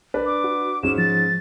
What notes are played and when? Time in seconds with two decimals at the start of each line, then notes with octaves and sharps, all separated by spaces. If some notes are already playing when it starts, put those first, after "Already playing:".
0.14 D4 B4 D5
0.26 D6
0.44 F#4
0.83 G#2 C#4 E7
0.98 F3 A6